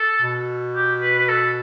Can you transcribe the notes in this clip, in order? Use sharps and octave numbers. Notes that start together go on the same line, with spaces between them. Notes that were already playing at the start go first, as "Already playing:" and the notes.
Already playing: A4
B2
G4
B4
B4
A4